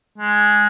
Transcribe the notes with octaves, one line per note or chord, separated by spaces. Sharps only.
G#3